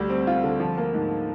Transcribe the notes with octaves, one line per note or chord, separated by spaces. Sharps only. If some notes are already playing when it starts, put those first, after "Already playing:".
Already playing: D2 G3
C4
F4
D3
F3
A#3
G#2